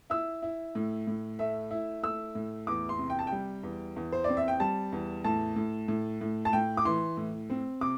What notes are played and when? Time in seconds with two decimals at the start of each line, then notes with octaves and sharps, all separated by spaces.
0.10 E4 E6
0.42 E4
0.75 A2
1.07 A2
1.39 A3 E5
1.71 E4
2.03 A3 E6
2.35 A2
2.67 E2 D6
2.89 C6
2.99 C3
3.10 G5
3.19 A5
3.27 G5
3.32 G3
3.63 E2
3.96 E2
4.12 C5
4.24 C4 D5
4.37 E5
4.48 G5
4.60 G3 A5
4.92 E2
5.24 A2 A5
5.56 A2
5.88 A2
6.21 A2
6.45 A5
6.53 A2 G5
6.77 D6
6.85 E3 C6
7.17 A2
7.50 C4
7.81 C3 D6